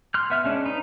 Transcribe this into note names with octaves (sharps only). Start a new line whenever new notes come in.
C6 F6 F#6
B3 E5 F6
G#3 C#4 D4
D#4 B4